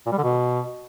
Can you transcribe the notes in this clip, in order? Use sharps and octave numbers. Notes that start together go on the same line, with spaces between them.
A#2
G3
D3
B2